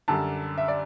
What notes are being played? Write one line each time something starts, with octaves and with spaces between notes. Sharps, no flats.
F#2 D3 G3 A5
E5
D5